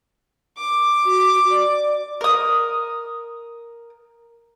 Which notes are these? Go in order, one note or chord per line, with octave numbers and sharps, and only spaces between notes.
D6
F#4
D5
A#4 D#6